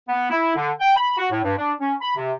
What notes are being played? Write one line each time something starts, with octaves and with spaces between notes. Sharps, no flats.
B3
E4
D3
G5
B5
F#4
A2
G2
D4
C#4
B5
C3